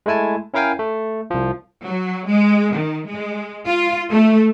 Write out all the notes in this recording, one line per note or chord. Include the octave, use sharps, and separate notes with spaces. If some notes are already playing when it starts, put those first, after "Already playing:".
G#3 A3 E4 G#5 A5
C#4 E4 A#4 F5 G5 G#5
A3
C2 F3
F#3
G#3
D#3
G#3
F4
A3